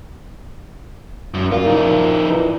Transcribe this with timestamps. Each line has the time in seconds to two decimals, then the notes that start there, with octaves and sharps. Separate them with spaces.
1.34 F#2
1.52 A#2 F4
1.67 F3 D#4
2.28 E3